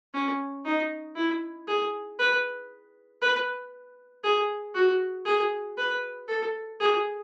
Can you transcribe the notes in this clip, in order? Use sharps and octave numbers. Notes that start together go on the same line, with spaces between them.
C#4
D#4
E4
G#4
B4
B4
G#4
F#4
G#4
B4
A4
G#4